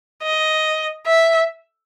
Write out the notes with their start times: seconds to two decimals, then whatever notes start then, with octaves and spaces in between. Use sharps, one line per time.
0.23 D#5
1.07 E5